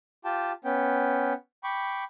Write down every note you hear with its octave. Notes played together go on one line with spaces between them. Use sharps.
F4 G4 G5 A5
B3 C#4 G5
G5 B5 C#6 D6